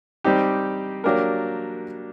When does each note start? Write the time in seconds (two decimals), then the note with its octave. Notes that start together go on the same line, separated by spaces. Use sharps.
0.24 G3 C4 D#4 G4
1.04 F#3 A#3 D4 G4 A#4